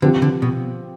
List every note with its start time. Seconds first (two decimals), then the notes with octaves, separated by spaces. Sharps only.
0.02 D3 F3 C4 G4
0.22 D3
0.42 B2